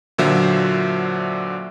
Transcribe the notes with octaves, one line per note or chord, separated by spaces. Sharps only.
A#2 D3 F#3 C5 E5